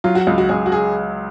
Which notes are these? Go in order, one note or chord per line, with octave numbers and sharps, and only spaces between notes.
F#3 F4
F#4
C#2 F4
F#4
C#2 G#4
F#4
G#4